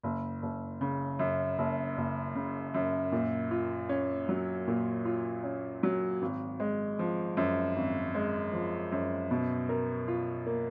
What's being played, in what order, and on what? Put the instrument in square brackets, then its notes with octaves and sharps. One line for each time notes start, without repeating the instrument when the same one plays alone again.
[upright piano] F#1
F#1
C#3
F#2
F#1
F#1
C#3
F#2
A#2
F4
C#4
F#3
A#2
F4
C#4
F#3
G#1
G#3
F3
F#2
G#1
G#3
F3
F#2
B2
A#4
F4
A#3